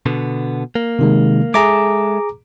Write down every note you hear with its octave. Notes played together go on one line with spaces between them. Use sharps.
B2 D3 B3
A#3
C3 D#3 G#3
G#3 G#4 A4 E5 A#5 D6